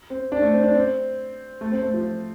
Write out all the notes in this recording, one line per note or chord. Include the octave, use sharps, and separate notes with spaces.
C4
D4
A3
C4
D4
C4
A3
C4
A3
F3
F3